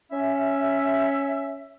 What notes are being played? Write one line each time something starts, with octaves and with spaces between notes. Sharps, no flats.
C#4 E5